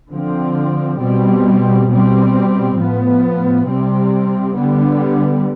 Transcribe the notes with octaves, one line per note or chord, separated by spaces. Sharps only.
D3 F3 C4
B2 G3 C4
B2 G3 C4
A2 F3 B3
C3 G3 C4
D3 G3 B3